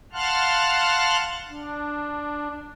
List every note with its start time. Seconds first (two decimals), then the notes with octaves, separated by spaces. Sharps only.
0.13 F5 F#5 A5 C6 F6 F#6
1.49 D4